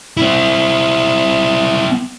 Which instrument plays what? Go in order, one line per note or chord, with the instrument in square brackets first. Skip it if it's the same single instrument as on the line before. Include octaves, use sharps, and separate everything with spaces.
[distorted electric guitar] C4 E4